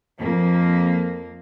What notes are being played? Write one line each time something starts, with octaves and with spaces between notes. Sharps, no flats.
F2 A#3